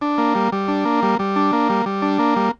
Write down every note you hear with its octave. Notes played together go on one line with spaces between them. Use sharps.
D4
A#3
G3
G3
D4
A#3
G3
G3
D4
A#3
G3
G3
D4
A#3
G3